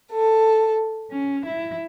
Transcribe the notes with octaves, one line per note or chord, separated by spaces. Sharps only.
A4
C#4
E4